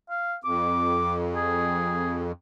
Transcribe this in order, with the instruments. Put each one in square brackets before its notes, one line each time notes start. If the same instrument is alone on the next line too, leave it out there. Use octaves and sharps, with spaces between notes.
[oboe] F5
[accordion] F2 [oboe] D6
[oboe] G#4